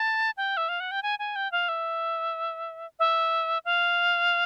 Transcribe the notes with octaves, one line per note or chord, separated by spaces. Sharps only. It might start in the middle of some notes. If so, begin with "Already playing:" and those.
Already playing: A5
G5
E5
F5
F#5
G5
G#5
G#5
G5
F5
E5
E5
F5